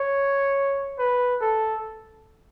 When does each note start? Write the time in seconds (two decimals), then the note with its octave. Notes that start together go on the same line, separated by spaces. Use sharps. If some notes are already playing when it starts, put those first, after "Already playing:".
Already playing: C#5
0.98 B4
1.41 A4